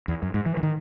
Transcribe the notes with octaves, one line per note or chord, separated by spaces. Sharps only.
E2
F#2
G#2
E3
E3
D#3